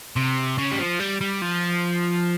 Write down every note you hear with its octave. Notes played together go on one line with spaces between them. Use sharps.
C3
C#3
G3
F3
G3
G3
F3